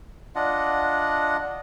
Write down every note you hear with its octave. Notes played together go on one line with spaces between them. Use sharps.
D4 F4 D#5 F#5